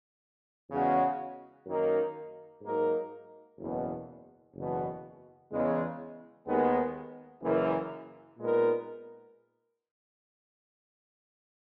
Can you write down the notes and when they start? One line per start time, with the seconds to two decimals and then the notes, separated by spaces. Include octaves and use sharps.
0.70 E2 C#3 G#3 C#4 F#4
1.66 F#2 D#3 A#3 D#4 A#4
2.62 G#2 F#3 A#3 D#4 A#4
3.58 F#1 E2 B2
4.54 F#1 E2 B2
5.50 E2 C#3 G#3
6.47 D#2 D#3 G#3 B3
7.42 F#1 F#2 E3 A#3
8.39 A#2 G#3 B3 D#4 A#4